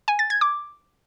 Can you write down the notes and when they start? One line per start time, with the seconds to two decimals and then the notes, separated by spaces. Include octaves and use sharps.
0.08 G#5
0.19 A6
0.30 G#6
0.41 D6